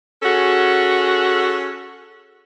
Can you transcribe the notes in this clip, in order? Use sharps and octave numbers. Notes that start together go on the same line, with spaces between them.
C#4 F#4 G#4 A4